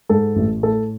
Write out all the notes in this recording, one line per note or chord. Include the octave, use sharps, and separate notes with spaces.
G#2 A4
A1
A2 A4